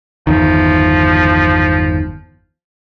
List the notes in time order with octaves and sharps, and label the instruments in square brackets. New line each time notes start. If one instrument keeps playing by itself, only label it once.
[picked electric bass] G1 E2 D#3 [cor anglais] F3